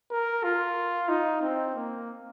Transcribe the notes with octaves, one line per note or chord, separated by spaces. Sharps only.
A#4
F4
D#4
C4
A#3